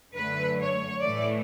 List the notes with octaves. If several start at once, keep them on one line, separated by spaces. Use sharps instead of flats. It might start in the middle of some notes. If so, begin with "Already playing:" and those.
F#2 D3 A3 B4
C#5
A2 E3 A3 D5